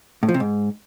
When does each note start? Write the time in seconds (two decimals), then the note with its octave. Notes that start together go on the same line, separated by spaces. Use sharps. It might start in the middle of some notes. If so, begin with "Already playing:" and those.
0.23 A2
0.29 F3
0.34 C3
0.40 G#2